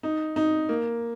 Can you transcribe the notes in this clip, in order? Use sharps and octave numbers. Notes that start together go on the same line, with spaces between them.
D#4
D#4
A#3